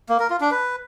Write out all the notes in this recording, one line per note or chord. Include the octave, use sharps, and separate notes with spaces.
A#3
A#4
F4
D4
B4